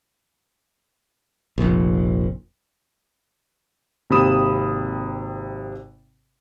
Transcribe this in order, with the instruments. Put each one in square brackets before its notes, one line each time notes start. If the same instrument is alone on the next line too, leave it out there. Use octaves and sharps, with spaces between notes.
[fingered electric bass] F1 A#1
[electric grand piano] G#1 C3 A#3 B5 D#6 E7